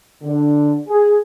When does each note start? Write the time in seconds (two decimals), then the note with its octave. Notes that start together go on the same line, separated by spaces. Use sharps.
0.22 D3
0.88 G#4